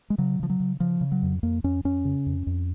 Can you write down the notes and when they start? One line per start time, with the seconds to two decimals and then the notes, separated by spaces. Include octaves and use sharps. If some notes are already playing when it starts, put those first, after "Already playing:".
0.10 G#3
0.18 C#3 F#3
0.40 C#3 F3
0.50 F#3
0.60 C#3
0.80 C#3 F3
1.01 C#3
1.12 F#3
1.23 F2
1.43 F2 A#3
1.64 F2 C#4
1.85 F2 C#4
2.05 C#3
2.26 F2
2.47 F2